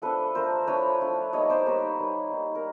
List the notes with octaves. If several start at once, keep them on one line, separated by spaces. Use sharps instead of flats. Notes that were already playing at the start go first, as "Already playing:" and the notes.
F3 A3 D4 A4 B4
F3 A3 D4 A#4 C5
F3 A3 D4 B4 C#5
F3 A3 D4
G3 A#3 D#4 C#5 D#5
C5 D5
G3 A#3 D#4 B4 C#5
G3 A#3 D#4
G3 A#3 D#4
A#4